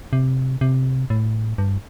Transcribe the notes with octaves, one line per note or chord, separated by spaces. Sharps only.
C3
C3
A2
G2